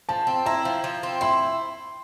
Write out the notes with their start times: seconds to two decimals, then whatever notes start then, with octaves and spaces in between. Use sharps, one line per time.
0.09 F3 A5
0.27 C4
0.46 E4 A#5
0.65 F3
0.84 F3
1.03 C4
1.21 E4 C6